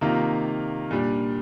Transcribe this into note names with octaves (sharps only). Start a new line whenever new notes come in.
C3 D#3 A#3 F4
A#2 G3 D4